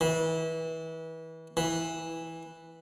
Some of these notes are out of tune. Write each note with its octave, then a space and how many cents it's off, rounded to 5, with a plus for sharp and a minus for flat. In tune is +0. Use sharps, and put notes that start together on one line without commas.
E3 -30
E3 -10